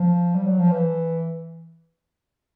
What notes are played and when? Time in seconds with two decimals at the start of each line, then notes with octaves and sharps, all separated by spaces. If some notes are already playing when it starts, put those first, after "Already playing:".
Already playing: F3
0.35 G3
0.47 F#3
0.59 F3
0.71 E3